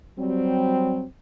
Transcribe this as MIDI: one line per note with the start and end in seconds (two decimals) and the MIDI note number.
0.19 1.02 54
0.19 1.02 55
0.19 1.02 60